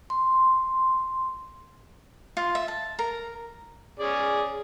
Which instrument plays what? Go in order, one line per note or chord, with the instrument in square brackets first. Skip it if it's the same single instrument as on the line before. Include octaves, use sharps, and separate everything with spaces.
[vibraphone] C6
[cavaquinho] F4
E5
A5
A#4
[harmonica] C#4 G#4 D5